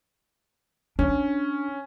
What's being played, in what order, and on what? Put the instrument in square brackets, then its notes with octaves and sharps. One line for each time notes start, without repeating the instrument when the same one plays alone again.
[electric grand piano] C#4 [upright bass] D4